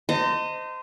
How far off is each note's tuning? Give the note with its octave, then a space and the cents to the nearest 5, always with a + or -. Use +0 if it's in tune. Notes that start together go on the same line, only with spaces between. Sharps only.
C5 -25 D#5 +0 A5 +45